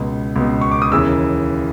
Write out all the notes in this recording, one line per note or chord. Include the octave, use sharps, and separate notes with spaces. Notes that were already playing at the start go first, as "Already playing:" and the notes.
Already playing: C#2 B2
C#2 B2
C#6
D6
D#6
D#2 C#3 E3 E6